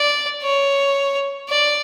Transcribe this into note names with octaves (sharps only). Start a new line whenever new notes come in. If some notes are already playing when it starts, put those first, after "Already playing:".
Already playing: D5
C#5
D5